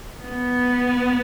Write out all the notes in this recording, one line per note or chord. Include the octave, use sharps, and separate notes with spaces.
B3